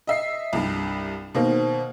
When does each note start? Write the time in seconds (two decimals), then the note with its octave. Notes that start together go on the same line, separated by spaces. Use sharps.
0.07 D#5 E5 C7
0.53 C2 G2
1.35 B2 D#3 A#3 C4